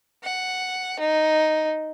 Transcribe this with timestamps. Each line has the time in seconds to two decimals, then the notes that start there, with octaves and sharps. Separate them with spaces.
0.23 F#5
1.00 D#4